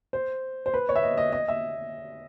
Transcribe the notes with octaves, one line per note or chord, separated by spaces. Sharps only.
C5
C5
B4
C#5
E5
D#5
D#5
D#5
E5